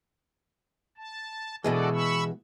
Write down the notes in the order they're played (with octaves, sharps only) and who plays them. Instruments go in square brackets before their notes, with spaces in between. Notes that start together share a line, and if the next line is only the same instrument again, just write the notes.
[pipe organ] A5
[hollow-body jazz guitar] B2 E3 G#3 [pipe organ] F#4 A4 D5
[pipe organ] B5 C#6 E6